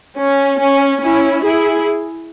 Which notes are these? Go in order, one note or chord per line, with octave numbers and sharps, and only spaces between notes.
C#4
C#4
C#4 E4
E4 G#4